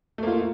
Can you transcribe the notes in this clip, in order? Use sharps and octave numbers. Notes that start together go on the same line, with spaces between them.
A3 A#3 F4